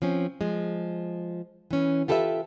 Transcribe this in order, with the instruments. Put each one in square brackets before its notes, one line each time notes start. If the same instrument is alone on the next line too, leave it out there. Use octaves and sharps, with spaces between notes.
[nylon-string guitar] F3 C4 C#4
F3 G#3
E3 C#4
F4 G4 A4 B4 C5 E5